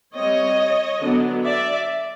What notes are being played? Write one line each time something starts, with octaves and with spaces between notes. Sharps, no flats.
G3 C4 C#5 D#5
D3 F#3 B3 D4
D5 E5